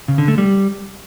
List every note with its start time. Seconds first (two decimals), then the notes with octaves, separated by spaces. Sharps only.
0.08 C#3
0.18 D3
0.28 A3
0.38 G3